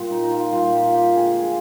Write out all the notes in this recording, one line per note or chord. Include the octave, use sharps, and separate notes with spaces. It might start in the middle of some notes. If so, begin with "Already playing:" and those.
Already playing: A#2 G3 F4
D#4
D#4
F4
A#2 G3 F4
G4
F4
G4
D3 G#3 G#4
G#4